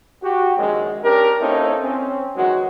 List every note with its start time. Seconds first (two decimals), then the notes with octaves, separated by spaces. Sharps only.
0.23 F#4 G4
0.57 A#1 F#2 D#3 F#3 G#3
1.04 C#4 D4 G4 A#4
1.40 A#3 C4 C#4 D#4 E4 A4
1.82 C4 C#4
2.36 D#3 E3 F#3 G#3 F#4